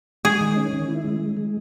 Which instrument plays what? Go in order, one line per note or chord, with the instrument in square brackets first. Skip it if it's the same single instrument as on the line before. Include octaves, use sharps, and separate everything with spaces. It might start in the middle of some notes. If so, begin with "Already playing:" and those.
[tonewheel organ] G#3 [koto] G#4
[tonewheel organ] D#3
C#4
D#3
E4
G#3
G#3
G#3